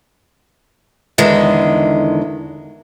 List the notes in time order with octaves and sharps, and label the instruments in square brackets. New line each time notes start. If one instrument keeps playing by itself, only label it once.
[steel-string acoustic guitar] E2 D3 D#3 G#3